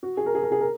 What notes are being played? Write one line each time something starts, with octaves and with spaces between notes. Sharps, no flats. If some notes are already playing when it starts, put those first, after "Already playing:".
F#4
G#4
A#4
G#4
A#4
G#4
A#4